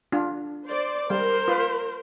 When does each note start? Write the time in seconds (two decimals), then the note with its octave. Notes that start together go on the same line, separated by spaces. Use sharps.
0.12 D4 F4
0.66 C5 D5
1.10 G3 A#4 C5
1.48 F4 B4